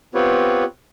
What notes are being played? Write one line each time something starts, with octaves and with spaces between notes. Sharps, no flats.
B3 C4 F4 G4 B4 C#5